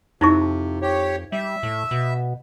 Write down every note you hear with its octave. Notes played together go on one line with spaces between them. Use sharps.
F2 C3 D#4 E4 C#6
G4 C#5
G3 E5
A2
B2